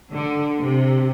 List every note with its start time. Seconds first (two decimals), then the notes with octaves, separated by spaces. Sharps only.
0.12 D3
0.59 C3